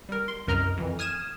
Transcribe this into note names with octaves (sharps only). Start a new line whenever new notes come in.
G3 A#4
C6
C2 F#2 A#4 D#5 A#5 F6
F2 E3
D#6 F6 G#6 D#7 E7